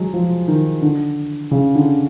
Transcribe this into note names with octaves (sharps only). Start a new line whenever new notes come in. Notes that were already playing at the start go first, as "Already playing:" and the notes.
Already playing: F#3 G#3
F3
D#3
D3
C#3
D3